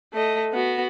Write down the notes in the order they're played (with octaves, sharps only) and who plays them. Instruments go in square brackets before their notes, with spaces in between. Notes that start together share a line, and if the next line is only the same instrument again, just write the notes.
[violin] A3 D#5
B3 F#4